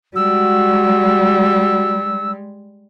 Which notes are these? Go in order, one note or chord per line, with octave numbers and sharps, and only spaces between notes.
G3 G#3 F#4 E6